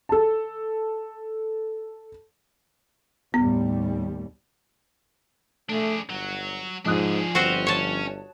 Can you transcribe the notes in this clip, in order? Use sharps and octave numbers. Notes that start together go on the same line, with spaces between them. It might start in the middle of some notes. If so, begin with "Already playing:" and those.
A4 A5
D#2 A2 G3 B3
A3 D4 G#4
G1 F#3
G#2 F3 D4 G#4 D#6 F#6
G1 C4 C#4 F#4 C5
C#5 A5